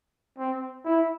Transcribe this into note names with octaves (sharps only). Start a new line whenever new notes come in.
C4
E4